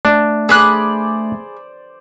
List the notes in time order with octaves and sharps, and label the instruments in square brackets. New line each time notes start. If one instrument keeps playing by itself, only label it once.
[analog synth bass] A3 [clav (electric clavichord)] D4
[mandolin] G#4 B5 F#6 [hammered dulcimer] C5 D5